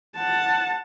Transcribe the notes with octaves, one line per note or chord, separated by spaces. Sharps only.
F#5 A5